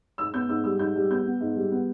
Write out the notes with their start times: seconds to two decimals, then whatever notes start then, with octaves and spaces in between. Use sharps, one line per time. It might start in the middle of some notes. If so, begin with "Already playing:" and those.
0.18 G#2 E6
0.34 B3 G6
0.49 G#2 E6
0.64 G3 E6
0.79 G#2 G6
0.96 G3
1.10 B3 G6
1.25 B3
1.41 G#2
1.56 G3
1.72 B3